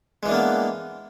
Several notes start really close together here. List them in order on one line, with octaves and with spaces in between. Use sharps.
G#3 E3 D4 A#3 B3